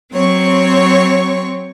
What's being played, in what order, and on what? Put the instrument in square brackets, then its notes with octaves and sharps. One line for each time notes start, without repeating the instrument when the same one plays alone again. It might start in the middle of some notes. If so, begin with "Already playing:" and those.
[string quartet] F#3 C4 C#5 C#6